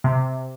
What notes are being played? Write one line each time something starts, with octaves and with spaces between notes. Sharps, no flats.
C3